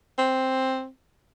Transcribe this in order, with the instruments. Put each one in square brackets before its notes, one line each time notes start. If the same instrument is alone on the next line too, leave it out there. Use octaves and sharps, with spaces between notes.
[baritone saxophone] C4